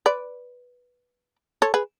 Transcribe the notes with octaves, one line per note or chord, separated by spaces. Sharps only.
B4 D5
A4 C#5
G#4 B4